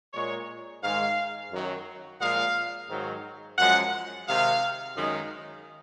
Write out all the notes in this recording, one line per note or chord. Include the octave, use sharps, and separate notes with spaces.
A#2 G#3 C#5
G#2 D#3 G#3 F5
F#2 D#3 F#3
A#2 F3 G#3 F5
G#2 D#3 F#3
F#2 F3 G#3 F#5
C3 D#3 G#3 F5
F#2 D#3 G#3